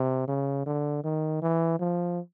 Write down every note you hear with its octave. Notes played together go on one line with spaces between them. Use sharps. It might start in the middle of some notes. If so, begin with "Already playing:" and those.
Already playing: C3
C#3
D3
D#3
E3
F3